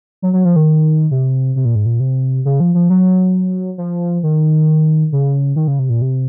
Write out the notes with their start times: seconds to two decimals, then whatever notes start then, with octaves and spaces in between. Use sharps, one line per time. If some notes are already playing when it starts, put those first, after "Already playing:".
0.22 F#3
0.33 F#3
0.45 F3
0.56 D#3
1.11 C3
1.56 C3
1.65 A#2
1.75 G#2
1.86 A#2
2.00 C3
2.45 C#3
2.60 F3
2.74 F3
2.90 F#3
3.78 F3
4.23 D#3
5.12 C#3
5.56 D#3
5.68 C#3
5.79 C3
5.90 A#2
6.02 C3